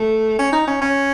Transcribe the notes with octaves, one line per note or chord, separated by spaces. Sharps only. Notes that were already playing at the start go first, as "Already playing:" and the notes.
Already playing: A3
C#4
D#4
C#4
C#4